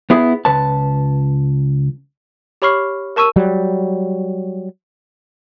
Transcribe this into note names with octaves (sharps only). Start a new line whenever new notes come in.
B3 E4 G#4
C#2 B4 A5
G4 C#5 B5 C#6 F6 C7
A#4 A5 C#6 E6 D#7
F#3 G3